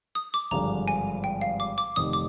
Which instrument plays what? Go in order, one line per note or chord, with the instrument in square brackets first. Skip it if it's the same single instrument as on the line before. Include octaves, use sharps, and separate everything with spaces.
[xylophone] D#6
D6
[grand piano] G#1 G2 D3 F3 G#3 [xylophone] A#5
[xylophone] G#5
G5
F5
D6
D6
[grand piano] F1 F2 D#3 [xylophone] D#6
[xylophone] D6